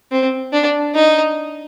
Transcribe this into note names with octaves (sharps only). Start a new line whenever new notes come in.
C4
D4
D#4